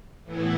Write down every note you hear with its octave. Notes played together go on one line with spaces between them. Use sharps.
A2 E3 B3 E4